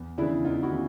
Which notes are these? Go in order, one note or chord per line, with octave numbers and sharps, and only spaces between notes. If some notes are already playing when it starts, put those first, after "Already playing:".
Already playing: E2
C#3 E3 D4 E4
E2 D#4 F4
E4 F#4
C#3 E3